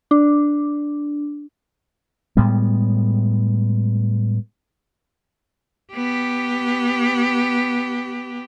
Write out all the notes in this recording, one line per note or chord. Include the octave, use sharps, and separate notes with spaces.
D4
A2 G3 G#3 B3
B3 G4